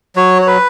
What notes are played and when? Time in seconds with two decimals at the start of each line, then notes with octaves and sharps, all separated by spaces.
0.16 F#3 C#5
0.42 C#5
0.47 B4